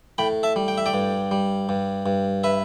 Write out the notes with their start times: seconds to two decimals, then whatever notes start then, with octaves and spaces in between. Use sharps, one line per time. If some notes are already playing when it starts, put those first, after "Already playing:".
0.18 A2 G5 B5
0.43 E5 A5
0.56 G3
0.68 G5
0.78 E5
0.86 D5 G5
0.94 G2
1.31 G3
1.69 G2
2.06 G2
2.44 B4 E5